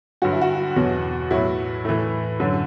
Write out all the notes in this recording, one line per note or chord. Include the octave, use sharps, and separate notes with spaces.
G2 D3 F#3 F#4
E4
F#4
E2 B2 F#3
A2 F#3 E4
A2 E3 A3
F#2 D3 F#3